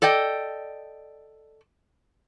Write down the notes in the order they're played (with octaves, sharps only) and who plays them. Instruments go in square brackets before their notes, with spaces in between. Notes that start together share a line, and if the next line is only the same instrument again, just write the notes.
[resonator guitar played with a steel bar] A4 D5 D#5 G5